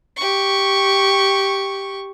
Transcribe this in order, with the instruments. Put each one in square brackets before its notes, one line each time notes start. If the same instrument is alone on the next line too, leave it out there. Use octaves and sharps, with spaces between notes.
[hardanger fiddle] G4 C#6